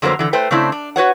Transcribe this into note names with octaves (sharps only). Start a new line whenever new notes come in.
F2 D3 F#3 A#3 B3 C5
D3 E3
A3 B4 C5 G5
C#3 A3 C4 D4 E4
D4
F#4 B4 C#5 F#5